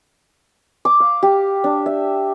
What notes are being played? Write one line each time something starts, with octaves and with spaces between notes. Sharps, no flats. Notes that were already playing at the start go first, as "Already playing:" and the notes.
D6
F5
G4
D4
E5